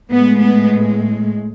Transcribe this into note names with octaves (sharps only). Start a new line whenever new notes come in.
A2 G#3 B3
B3